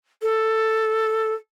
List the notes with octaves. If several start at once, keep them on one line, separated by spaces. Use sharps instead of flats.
A4